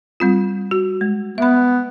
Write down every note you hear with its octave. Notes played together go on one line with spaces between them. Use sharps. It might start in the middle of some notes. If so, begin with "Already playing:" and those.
G3 C4 F4
F#4
G#3
B3 E5 B5